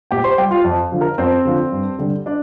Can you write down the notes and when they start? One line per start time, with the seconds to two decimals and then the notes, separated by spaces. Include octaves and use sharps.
0.11 A#2 G4 G5
0.24 C5 C6
0.38 G3 G4 G5
0.51 F4 F5
0.64 F2
0.92 D3 F3
1.01 A#4
1.18 F2 C4 C5
1.45 D3 F3
1.72 G2
1.99 D3 G3
2.26 D4 D5